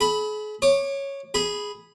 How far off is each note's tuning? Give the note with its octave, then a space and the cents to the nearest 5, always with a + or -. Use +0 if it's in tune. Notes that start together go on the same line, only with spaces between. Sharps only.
G#4 +40 B5 +0
C#5 -5 D6 +25
G#4 +0 B5 +0